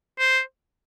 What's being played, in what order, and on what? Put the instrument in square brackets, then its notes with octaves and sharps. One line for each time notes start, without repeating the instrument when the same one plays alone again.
[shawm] C5